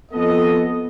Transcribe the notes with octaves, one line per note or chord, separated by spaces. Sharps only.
F2 B3 A4 D#5